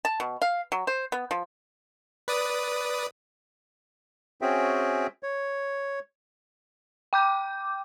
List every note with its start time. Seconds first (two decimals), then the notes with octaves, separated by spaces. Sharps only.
0.05 A5
0.20 B2
0.42 F5
0.72 F#3
0.87 C5
1.12 B3
1.31 F3
2.28 B4 D5 D#6
4.42 C4 C#4 F#4 G#4 E5 G5
5.23 C#5
7.13 G5 D6 G6